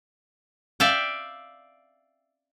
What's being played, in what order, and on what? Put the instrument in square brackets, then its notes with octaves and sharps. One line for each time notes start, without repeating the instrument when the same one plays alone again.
[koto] D5 E5 F5 G5